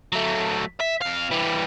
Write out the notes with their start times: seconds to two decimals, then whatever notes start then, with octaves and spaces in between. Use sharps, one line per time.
0.12 F#3 A3
0.80 E5
1.01 F2 F5
1.31 E3 G3